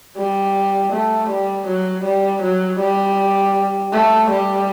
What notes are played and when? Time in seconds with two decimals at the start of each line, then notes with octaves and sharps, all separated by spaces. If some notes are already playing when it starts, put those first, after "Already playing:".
0.17 G3
0.92 A3
1.30 G3
1.67 F#3
2.05 G3
2.43 F#3
2.80 G3
3.93 A3
4.31 G3